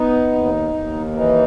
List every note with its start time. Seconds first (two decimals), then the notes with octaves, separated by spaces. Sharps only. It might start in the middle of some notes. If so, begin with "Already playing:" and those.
Already playing: B3 D#4
0.33 D#2
0.74 D#2
1.14 E3 D#4